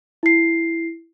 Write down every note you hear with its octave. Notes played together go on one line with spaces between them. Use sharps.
E4 C7